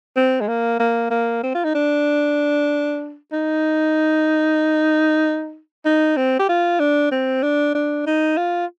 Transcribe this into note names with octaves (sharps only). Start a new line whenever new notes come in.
C4
G#3
A#3
A#3
A#3
C4
F4
D#4
D4
D#4
D#4
C4
G4
F4
D4
C4
D4
D4
D#4
F4